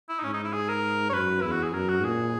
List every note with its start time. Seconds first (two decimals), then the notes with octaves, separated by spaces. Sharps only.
0.09 E4
0.19 D#4
0.24 G#2 C#4
0.33 D#4
0.44 E4
0.53 G#4
0.69 A#4
1.10 C#5
1.13 F#2 B4
1.41 E2 E4
1.52 F#4
1.63 G#4
1.73 F#2 A#4
1.89 F#4
2.04 A#2 G#4